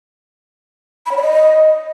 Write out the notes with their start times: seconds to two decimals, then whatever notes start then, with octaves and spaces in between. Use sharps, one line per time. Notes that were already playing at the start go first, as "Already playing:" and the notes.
1.06 B5
1.11 C#5
1.17 D5
1.22 D#5